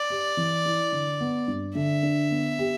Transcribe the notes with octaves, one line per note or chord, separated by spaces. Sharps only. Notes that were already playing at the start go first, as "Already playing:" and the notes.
Already playing: D5
G4
E3
E4
D3
B3
G2
D3 E5
D4
B3
G4